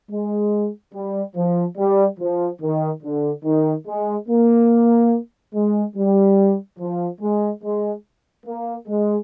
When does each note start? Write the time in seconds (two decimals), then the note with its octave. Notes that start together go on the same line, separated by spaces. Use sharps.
0.11 G#3
0.94 G3
1.36 F3
1.78 G3
2.19 F3
2.62 D#3
3.03 D3
3.44 D#3
3.87 G#3
4.29 A#3
5.54 G#3
5.97 G3
6.79 F3
7.21 G#3
7.64 G#3
8.46 A#3
8.88 G#3